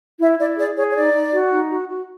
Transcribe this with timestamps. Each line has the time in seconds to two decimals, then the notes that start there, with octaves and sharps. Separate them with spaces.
0.20 E4 E5
0.38 E4 D5
0.57 G#4 D5
0.76 G#4 C#5
0.90 C#5
0.95 D#4 D5
1.13 D#4
1.32 F#4
1.51 D#4
1.70 F#4
1.89 F#4